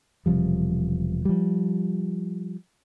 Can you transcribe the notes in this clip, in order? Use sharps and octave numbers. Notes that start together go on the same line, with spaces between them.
E1 C3 F3 G3
F3 G3